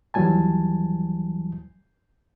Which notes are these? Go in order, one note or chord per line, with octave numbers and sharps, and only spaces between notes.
D#2 E3 F#3 G3 G#5 A5